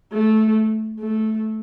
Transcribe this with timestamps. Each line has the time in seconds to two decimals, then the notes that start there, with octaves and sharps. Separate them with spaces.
0.13 A3
1.00 A3